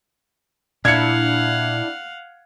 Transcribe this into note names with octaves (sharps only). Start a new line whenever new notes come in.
A#2 D4 E4 F5 F#5 G#6 C#7